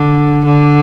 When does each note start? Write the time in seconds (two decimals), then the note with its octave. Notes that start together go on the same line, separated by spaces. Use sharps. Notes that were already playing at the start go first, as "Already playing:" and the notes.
Already playing: D3
0.45 D3